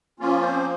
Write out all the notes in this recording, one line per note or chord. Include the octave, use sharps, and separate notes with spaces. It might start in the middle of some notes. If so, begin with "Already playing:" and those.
F3 A#3 C#4 F4
C4 C5